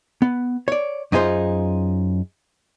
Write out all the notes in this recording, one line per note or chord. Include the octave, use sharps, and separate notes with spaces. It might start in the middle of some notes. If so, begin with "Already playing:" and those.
B3
C#5 D5
F#2 D#4 F4 G#4 C5